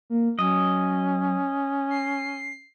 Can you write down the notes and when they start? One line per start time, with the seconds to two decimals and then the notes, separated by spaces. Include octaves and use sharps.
0.10 A#3
0.39 F#3 C#4 D#5
1.90 C7